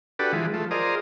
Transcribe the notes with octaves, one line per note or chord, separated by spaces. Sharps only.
D4 F#4 G4 A4 B4
E3 F3 G#3
F3 A3
F4 G#4 A#4 C5 D5 D#5